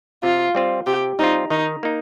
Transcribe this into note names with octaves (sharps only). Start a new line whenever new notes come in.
C3 F4
G3 C4 F4
C3 G4
G3 C4 D#4 F4
D#3 D#4
A#3 D#4